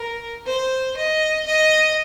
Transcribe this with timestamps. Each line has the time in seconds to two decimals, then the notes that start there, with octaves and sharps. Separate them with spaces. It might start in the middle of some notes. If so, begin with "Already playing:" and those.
Already playing: A#4
0.46 C5
0.97 D#5
1.46 D#5